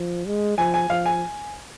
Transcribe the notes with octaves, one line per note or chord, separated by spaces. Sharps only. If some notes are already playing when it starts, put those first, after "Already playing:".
Already playing: F3
G#3
F3 G#5
G#5
F3 F5
G#5